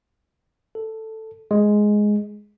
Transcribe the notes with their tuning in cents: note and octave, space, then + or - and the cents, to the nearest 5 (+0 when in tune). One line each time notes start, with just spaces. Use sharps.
A4 +5
G#3 +5